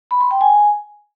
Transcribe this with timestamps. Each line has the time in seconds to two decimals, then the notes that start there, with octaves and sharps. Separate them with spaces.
0.11 B5
0.21 C6
0.31 G5
0.41 G#5